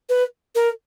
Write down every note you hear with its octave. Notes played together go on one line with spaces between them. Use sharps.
B4
A#4